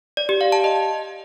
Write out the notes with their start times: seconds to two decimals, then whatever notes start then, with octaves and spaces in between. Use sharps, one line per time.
0.17 D5
0.29 G4
0.41 F5
0.52 A5
0.64 D#5